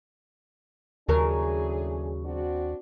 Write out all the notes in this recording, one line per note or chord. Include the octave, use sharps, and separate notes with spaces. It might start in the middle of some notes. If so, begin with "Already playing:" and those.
D#2 A2 C#3 F#3 D4 G#4 A#4
C4 D4 F#4